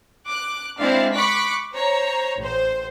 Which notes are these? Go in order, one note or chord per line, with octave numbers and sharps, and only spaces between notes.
D6 F#6
G#3 C4 D4 E4 D5 F5
B5 C#6 D6 F#6 B6
C5 C#5 A#5
A1 C5